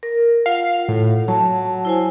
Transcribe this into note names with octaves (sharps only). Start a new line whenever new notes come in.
A#4
F4 F5 F#5
A2
F#3 A5
E4 C5 G#5